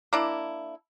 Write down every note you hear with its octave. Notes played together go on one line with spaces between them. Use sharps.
A#3 D4 E4